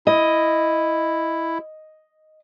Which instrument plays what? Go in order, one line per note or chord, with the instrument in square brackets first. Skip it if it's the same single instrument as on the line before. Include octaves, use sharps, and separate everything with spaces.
[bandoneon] E4 [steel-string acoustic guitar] D#5